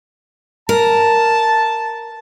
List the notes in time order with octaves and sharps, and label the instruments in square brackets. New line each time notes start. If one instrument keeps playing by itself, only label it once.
[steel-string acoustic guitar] A#4 [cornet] A5